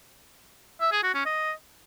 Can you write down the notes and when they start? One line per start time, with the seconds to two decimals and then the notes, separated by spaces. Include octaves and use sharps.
0.81 E5
0.92 G#4
1.03 F#4
1.14 C#4
1.26 D#5